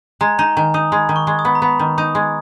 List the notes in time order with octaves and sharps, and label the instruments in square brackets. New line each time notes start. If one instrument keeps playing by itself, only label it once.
[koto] G#3 [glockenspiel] A#5
[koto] D#4 [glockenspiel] A#5
[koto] D#3 [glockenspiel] G#5
[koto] D#4 [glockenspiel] D#6
[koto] G#3 [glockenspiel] B5
[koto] D#3
[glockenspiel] C#6
[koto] G#3
[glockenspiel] D#6
[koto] B3
[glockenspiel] A#5
[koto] B3 [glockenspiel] B5
[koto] D#3
[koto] D#4 [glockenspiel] D#6
[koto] G#3